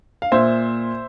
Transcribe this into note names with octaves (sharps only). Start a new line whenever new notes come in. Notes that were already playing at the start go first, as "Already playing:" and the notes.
F5
A#2 C5 E5